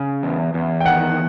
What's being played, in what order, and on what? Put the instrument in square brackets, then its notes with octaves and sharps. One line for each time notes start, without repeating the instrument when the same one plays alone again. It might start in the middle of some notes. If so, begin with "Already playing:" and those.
Already playing: [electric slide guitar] C#3
E2
E2
[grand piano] G5
[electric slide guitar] D#3 [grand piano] F#5